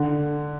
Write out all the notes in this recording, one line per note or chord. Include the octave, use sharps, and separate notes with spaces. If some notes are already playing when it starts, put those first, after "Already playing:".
Already playing: D3